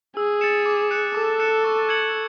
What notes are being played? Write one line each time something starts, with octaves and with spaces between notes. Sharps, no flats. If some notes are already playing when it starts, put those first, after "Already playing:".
G#4 E6
A6 C#7 E7
D6
F#6 C#7 E7
A4 D6
F#6 C#7 E7
C#6
G#6 C#7 F#7